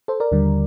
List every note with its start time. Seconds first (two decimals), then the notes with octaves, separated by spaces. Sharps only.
0.08 A4 C5
0.20 A#4 D5
0.32 D#2 D3 G3